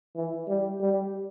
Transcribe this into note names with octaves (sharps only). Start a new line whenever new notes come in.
E3
G3
G3